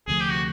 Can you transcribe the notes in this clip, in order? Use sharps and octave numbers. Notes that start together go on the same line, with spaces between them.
D2 C3 F3 A3 G#4
G4
F#4